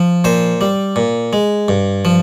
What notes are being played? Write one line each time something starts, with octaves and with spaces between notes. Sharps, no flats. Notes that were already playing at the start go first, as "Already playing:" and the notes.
Already playing: F3
A#2 C5
G3
A#2
G#3
G2
F3